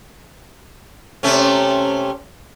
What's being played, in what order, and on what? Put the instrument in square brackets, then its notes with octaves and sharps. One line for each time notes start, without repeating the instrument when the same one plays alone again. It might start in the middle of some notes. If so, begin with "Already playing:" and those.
[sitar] C3 A3 C#4